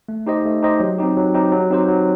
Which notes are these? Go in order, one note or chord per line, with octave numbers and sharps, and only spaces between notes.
A3
D#4 G4 C5 D#5
A3
D#4 G4 C5 D#5
F#3
C4 D#4 G4
F#3
C4 D#4 G4
F#3
C4 D#4 G4 C5
F#3